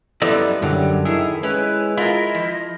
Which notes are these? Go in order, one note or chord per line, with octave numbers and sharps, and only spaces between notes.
F#2 G3 B3 E4 A4 D5 D#5
F#2 D3 F#3 G3
A2 D#3 E4 G#4
G#3 C#4 B4
E4 F4 A#4 D#5
F3